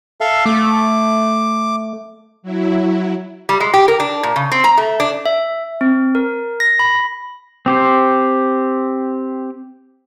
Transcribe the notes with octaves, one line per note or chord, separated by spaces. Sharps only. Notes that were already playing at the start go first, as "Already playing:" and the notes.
A4 E5 F5
A3 D6
F#3 E4
G3
G#3
G4
A#4
D4
A#2
C#3
C4
A#5
A3
D4
E5
C4
A#4
A#6
B5
C4 G4 C5